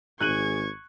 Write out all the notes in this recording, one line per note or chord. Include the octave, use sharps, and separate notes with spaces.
G#1 G#4 C#6 F#6 G#6 D#7 F#7